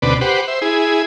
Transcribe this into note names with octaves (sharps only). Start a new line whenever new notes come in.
D2 B2 C4 B4 D5
G4 B4 C5 F#5
C5 E5
E4 G#4